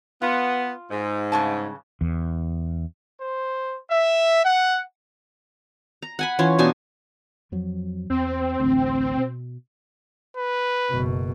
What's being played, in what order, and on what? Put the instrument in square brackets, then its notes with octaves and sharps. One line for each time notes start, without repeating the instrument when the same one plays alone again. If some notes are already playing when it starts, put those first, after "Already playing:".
[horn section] B3 [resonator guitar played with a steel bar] F4
[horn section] G#2
[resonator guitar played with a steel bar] G2 C#3 A5
[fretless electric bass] E2
[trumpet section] C5
E5
F#5
[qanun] A#5
F#5 G#5 B5
E3 C#4 F4 C#5
B2 D4 D#4 G#5
[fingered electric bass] F2 F3 F#3
[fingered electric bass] E2 [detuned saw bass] C4
[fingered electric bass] A1 D2
B2
[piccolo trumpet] B4
[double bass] F#1 B2